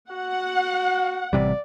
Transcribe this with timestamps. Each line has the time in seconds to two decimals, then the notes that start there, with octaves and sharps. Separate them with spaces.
0.11 F#4 F#5
1.33 A1 C3 G3 D5